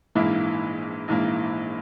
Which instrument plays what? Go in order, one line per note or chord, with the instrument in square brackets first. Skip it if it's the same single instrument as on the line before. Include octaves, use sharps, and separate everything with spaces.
[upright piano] A#1 G#2 E3 A#3 E4
A#1 G#2 E3 A#3 E4